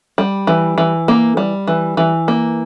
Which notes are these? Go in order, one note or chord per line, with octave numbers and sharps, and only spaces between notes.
G3
E3
E3
A#3
G3
E3
E3
A#3